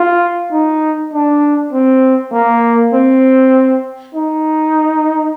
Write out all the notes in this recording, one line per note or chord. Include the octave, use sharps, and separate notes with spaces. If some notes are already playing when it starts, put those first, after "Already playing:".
Already playing: F4
D#4
D4
C4
A#3
C4
D#4